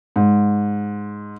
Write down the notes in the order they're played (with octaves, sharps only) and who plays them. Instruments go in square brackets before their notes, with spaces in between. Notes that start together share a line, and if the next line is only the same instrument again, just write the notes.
[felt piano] G#2